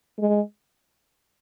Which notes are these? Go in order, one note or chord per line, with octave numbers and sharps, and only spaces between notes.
G#3